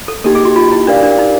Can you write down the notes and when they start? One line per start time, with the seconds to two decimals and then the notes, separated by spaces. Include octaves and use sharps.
0.08 A4
0.24 A#3 D#4 G4 A4
0.35 G#4
0.45 F#4
0.56 F4
0.72 E4
0.87 D4 G4 A#4 D5 F5
1.03 D4
1.19 D#4